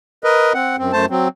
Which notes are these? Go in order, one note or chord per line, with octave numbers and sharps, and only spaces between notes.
A#4 B4 D#5
C4 F#5
F#2 C4
F#2 A3 C5 A5
F#3 C4